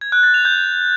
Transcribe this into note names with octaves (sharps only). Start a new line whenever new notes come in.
G#6
F#6
A6
F7
G6